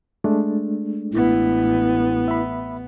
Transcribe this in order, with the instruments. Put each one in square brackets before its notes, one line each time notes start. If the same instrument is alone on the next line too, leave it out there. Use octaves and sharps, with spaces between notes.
[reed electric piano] G#3 A3 D4
[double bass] A1 B3 [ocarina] E4
[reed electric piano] E5 B5